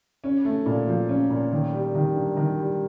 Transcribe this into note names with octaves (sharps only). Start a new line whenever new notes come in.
C#4
A3
A#2
F3
C#4
A#2
D#3
G3
D#3
G2
D#3
G3